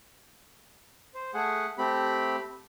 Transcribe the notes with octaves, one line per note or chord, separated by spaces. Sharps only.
C5
A3 G#4 F#5
A3 C4 G4 B5